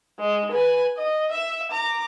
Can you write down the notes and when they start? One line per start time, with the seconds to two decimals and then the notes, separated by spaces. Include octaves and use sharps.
0.20 G#3
0.51 B4 G#5
0.97 D#5
1.32 E5
1.71 A#5 D6